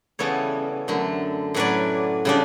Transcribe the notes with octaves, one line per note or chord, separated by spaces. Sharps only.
C#3 E3 G3 B3 A4 C#5
F#2 D3 A3
A2 F#3 C#4 B4 D5
C#3 G3 D4